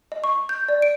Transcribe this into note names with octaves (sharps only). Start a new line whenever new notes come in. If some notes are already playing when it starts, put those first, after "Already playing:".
D#5
C#6
G6
D5
D7